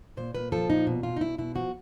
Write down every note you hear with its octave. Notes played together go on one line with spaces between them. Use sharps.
A#2 C5
A#2 B4
F3 A4
A#2 D#4
B2
B2 F4
D#4
B2 E4
B2 E4
F3 F#4